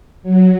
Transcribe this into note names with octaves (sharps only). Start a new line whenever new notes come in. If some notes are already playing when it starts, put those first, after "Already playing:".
F#3